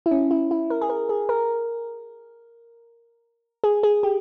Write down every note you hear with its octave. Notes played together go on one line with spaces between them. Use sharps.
E4
C#4
E4
E4
A#4
G#4
A#4
G#4
A#4
G#4
G#4
G4